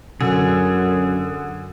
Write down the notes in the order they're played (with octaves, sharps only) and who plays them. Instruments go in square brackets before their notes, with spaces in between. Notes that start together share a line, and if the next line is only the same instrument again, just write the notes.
[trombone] F#2 [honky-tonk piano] D3 [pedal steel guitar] G#4